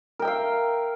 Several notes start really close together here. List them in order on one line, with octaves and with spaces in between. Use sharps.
A#4 G5 E5 F5